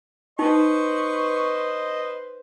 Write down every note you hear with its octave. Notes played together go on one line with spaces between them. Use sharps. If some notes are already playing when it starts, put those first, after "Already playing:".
D#4 B4 C5 D#5 C#6